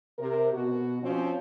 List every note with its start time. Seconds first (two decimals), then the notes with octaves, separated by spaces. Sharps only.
0.18 C3 A#4
0.52 B2 F#4
1.02 F3 C4 C#4